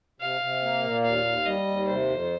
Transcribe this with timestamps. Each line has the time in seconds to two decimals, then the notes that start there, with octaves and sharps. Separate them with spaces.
0.20 C3 F5
0.41 C3
0.62 A#3
0.83 A#2
1.04 D#2 F5
1.25 D#2
1.46 G3 D#5
1.67 D#2
1.88 C3 C5
2.10 F2